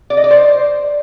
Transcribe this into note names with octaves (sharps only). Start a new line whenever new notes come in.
D5
D#5
D5
C5